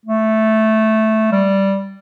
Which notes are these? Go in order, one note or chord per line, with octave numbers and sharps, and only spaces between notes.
A3
G3